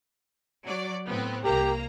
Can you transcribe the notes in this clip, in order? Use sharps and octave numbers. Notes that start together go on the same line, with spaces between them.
F#3 D5
A2 B3 C4
C2 A#3 G4 A#5